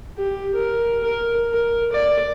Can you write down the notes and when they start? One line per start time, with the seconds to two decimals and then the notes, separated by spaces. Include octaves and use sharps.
0.18 G4
0.55 A#4
1.04 A#4
1.51 A#4
1.92 D5